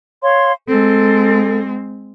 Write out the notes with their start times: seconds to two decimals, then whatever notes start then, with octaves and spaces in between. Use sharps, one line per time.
0.23 C#5 F5 C6
0.68 G#3 C4 A4